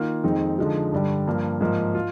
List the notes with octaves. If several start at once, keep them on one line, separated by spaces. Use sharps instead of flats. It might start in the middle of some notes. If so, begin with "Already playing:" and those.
Already playing: D#3 A#3 F4
F2 D#3 G#3 C4 D#4
D3 F3 G#3 D#4
G2 D3 G3
G2 F3 A#3
G#2 F3 A#3
F4